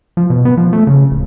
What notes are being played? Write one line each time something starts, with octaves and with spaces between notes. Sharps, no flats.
F3
B2
B3
F3
A3
C#3
D1